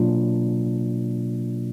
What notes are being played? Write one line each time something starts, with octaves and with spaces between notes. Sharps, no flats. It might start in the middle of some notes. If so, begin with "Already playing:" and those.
Already playing: B2 F#3 A#3 D4 F4